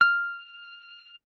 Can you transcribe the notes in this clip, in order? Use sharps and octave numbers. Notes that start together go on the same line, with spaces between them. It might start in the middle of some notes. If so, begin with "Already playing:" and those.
F6